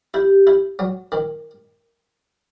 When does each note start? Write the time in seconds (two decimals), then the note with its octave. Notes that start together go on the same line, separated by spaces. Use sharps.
0.14 E4 G4
0.47 E4
0.79 F#3
1.12 D#3